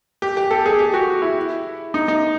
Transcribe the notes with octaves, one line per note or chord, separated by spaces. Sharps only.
G4
G4
A4
G#4
G4
F#4
E4
D#4
D#4